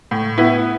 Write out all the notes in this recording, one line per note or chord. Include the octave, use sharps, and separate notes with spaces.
A2
B3 E4